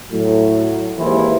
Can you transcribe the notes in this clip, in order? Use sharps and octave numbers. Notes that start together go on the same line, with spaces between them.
A2 F#3
D#2 G#2 E3 E4 B4 C5